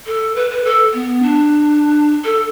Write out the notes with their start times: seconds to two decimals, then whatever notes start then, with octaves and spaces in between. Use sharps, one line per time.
0.07 A4
0.35 B4
0.50 B4
0.64 A4
0.93 B3
1.23 D4
2.24 A4